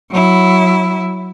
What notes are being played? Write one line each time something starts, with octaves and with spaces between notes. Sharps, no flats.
F#3 E4